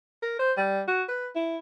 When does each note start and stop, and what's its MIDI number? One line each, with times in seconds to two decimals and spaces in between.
0.22 0.39 70
0.39 0.52 72
0.57 0.82 55
0.88 1.03 66
1.09 1.29 71
1.35 1.58 64